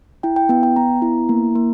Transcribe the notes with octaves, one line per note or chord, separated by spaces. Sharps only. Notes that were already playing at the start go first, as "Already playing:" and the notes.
E4 G5
G5
B3 G5
G5
B3 A#5
E4
A#3
A#3